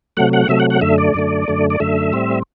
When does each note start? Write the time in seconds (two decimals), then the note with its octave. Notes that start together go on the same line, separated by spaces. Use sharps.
0.17 C3 F#3 A3 F#5
0.33 F#5
0.49 C3 F#3 A3 E5
0.60 F#5
0.70 F#5
0.81 F#2 D3 A3 E5
0.98 D5
1.14 F#2 D3 A3
1.48 F#2 D3 A3
1.70 D5
1.80 F#2 D3 A3 E5
2.13 A2 G3 C4